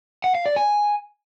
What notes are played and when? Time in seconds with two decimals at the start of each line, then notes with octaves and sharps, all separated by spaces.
0.24 F#5
0.35 F5
0.46 D5
0.56 G#5